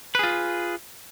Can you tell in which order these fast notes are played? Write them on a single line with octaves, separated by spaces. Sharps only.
B4 G#4 F4